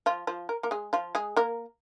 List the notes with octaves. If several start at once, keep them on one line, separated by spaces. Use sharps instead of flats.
F3 F4
F3 F4
A#4
A#3 A#4
G#3 G#4
F3 F4
G#3 G#4
A#3 A#4